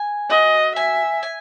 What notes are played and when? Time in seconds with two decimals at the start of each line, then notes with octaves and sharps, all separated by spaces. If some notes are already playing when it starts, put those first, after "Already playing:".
Already playing: G#5
0.30 F#4 D#5
0.76 E5 G#5
1.23 G#5